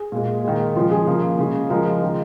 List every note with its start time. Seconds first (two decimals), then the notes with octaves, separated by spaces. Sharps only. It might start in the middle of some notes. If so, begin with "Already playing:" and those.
Already playing: G#4
0.12 A#2 G#3
0.44 D#3 G#3
0.76 C#3 F3 G#3 F4
0.91 G#4
1.07 C#3 F3 A#3
1.39 C#3 G#3
1.70 C#3 F3 G#3 A#4
2.02 D#3 G#3